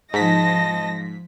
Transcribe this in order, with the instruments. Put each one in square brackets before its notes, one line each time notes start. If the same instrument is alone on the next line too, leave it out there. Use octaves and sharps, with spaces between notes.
[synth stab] G#2 B6 [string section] F3 A#6 [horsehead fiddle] D#5 A5